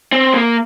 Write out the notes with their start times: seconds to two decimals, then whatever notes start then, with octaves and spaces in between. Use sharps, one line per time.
0.12 C4
0.34 A#3